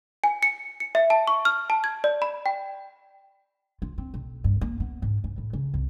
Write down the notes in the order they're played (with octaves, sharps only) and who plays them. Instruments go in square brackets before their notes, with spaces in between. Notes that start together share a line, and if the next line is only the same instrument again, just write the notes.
[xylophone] G#5
C#7
C#7
E5
A5
C#6
F6
A5
G#6
D5
B5
G5
[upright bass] F4
C4
B1
G2
A#3
B3
G#2
G#2
A2
C#3
C2